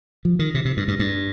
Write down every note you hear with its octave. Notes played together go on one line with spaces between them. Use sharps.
F3
D#3
C3
C3
G2
G2
G2